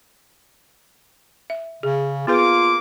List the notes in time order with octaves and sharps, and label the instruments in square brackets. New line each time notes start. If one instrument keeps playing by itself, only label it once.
[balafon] E5
[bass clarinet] C#3 [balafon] G#4
[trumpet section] A#3 D6 [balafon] B3 G#4 B4 [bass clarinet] F4